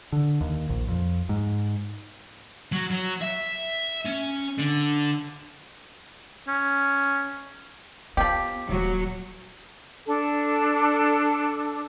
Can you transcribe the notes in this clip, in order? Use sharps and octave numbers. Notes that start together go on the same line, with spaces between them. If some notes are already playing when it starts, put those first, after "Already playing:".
D3
D#2
A#1
F2
G#2
F#3
F#3
E5
C#4
D3
C#4
F3 B3 G4
D#1 F#3
D4 A4